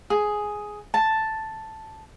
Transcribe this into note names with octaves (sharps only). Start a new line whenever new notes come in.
G#4
A5